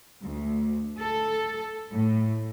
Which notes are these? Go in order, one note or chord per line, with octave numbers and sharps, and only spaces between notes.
D2
A4
A2